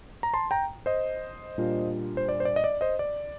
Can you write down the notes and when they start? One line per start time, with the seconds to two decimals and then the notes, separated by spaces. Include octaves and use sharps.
0.23 A#5
0.33 A5 C6
0.51 G5 A#5
0.86 C5 D#5
1.58 A#2 G3 D4 F4
2.17 C5
2.29 D5
2.40 C5
2.45 D5
2.56 D#5
2.64 D5
2.81 C5 D#5
2.99 D5